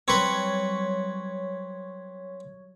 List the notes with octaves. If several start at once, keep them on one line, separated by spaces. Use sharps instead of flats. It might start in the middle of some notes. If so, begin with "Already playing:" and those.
F#3 G3 C4 B4 C#5 C#6 G#6